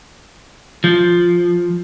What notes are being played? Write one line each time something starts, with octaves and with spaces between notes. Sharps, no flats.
F3